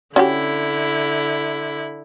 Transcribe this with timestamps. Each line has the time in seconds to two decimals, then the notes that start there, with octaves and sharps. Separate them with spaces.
0.16 D3 C#4 E4 F#4 G4